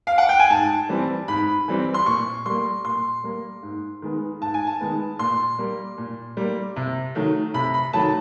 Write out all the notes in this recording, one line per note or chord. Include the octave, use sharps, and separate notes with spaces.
F5
F#5
G5
G#5
G#2 A5
E3 G3 C4
G#2 B5
E3 G3 C4
C6
A#2 C#6
G3 A#3 C6
A#2 C6
G3 A#3
G#2
D#3 G#3 B3
G#2 A5
G#5
A5
D#3 G#3 B3
A#2 C6
G3 A#3
A#2
G3 A#3
C3
D#3 F#3 A3
C3 B5
B5
D#3 F#3 A3 A5